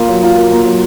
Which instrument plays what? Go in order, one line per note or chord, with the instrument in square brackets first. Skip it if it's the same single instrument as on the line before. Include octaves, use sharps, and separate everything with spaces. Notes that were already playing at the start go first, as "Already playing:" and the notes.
Already playing: [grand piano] A#3 F4 A#4
F#3
F4
A#4
A#3
F#3